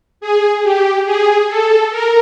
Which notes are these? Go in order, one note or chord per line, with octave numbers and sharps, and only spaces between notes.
G#4
G4
G#4
A4
A#4